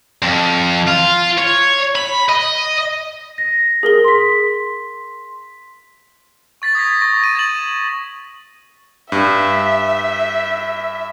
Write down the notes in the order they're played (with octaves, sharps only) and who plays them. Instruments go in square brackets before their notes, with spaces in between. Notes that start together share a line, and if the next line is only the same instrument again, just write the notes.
[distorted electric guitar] F2
F4
C#5
B5
D#5
[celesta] A#6
[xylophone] G#4 A#4 G7
[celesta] C6 B6
[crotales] C#6 A6 B6
D#6 G#6 A#6 B6
C#6 A#6
G#6 D#7
A6 E7 F#7
[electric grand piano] G2 [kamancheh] E5